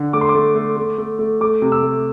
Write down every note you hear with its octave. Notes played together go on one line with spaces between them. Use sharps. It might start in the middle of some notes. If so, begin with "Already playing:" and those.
Already playing: D3
A3 D6
C6
D6
A3
A3
A3
A3
A3
A3 D6
C3
E6
A3